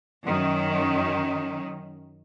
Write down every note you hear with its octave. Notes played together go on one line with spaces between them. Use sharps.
F#2 D#3 C#4